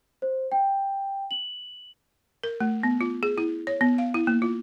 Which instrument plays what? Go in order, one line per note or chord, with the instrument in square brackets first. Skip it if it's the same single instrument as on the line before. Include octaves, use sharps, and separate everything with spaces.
[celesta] C5
G5
F#7
[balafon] A#4
A3
B3
F4
G#4
E4
C#5
B3
F5
E4
A#3
F4